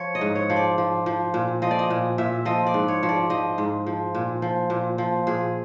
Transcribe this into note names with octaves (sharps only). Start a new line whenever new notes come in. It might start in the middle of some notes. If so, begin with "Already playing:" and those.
Already playing: F3 C#5
D#5
G#2
C#5
F3
D5
F3
F3
A#2
F3 D#5
D5
D#5
A#2
A#2 E5
F3 D#5
D5
G#2
C#5
F3
D5
F3 D#5
G#2
F3
A#2
F3
A#2
F3
A#2 G#4